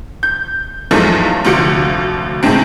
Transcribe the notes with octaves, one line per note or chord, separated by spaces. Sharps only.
G6
E2 G#2 F3 F#3 G#3 A3
F1 D2 F3 F#4 C#7 D7
A2 C3 D#3 G#3 C4